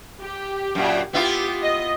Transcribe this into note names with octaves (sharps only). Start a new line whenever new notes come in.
G4
F#2 A#2
B3 E4 F4 G4
D#5